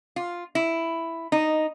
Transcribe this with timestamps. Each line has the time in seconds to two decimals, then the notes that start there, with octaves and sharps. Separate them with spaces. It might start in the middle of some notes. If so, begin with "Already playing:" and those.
0.16 F4
0.55 E4
1.32 D#4